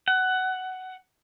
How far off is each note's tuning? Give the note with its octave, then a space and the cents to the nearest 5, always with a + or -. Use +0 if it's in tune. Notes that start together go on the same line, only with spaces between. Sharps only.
F#5 +15